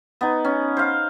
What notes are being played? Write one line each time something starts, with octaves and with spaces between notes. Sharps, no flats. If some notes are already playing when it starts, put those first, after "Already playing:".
B3 D#4
C#4
C5 F5